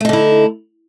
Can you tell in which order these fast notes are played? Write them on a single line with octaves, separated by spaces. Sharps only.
A3 D#4 D3 E4